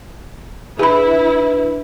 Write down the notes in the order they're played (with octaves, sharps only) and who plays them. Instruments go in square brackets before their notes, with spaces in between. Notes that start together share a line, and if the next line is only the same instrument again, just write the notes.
[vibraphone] D4 B4 [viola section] E4 [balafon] G#4 B5